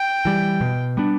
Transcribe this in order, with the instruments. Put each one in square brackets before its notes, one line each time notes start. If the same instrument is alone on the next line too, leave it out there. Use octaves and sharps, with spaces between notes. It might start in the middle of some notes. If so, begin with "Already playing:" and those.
Already playing: [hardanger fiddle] G5
[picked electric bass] E3 G3
B2
G3 B3 D4